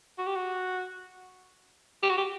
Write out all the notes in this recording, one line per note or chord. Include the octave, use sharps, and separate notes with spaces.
F#4
G4
F#4
G4
F#4
G4